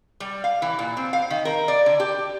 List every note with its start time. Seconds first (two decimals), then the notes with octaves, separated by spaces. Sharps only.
0.20 G3
0.44 F5
0.62 E3
0.79 A#2
0.97 C4
1.13 F5
1.30 D#3
1.45 A#4
1.68 D5
1.86 D3
2.00 G4